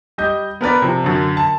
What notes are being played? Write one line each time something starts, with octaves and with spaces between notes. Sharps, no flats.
G3 D#5 G6
B3 A#4 B4 D5
C3 F3
F#2 D3
A5